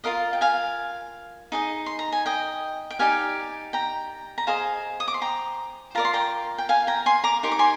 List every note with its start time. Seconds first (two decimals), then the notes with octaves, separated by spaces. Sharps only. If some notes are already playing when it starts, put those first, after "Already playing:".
0.04 F4 A#4 D#5 F5
0.33 G5
0.41 F5 G#5
1.52 D#4 G#4 C5 D#5
1.86 C6
1.99 A#5
2.12 G#5
2.26 D#5 G5
2.90 G5
2.99 D#4 G4 D5 F5 G#5
3.73 G5 A#5
4.38 A#5
4.47 G#4 C5 D#5 F5 G#5
5.00 D#6
5.08 D6
5.14 C6
5.22 G5 A#5
5.95 F4 A#4 D5 A#5
6.05 C6
6.13 G5 A#5
6.58 G5
6.69 F5 G#5
6.87 G5 A#5
7.06 G#5 C6
7.24 A#5 D6
7.43 D#4 G4 A#4 C6
7.52 D6
7.59 G#5 C6